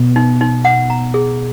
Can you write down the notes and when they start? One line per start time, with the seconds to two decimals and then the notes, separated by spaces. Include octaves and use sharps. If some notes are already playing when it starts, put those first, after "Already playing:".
Already playing: B2 B3
0.16 D#4
0.41 D#4
0.65 F#5
0.90 A#5
1.14 G#4